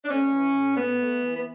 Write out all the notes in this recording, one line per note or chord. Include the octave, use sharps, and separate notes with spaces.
D4
A3 C#4
E3
A2
A2 B3
A3
E3
B3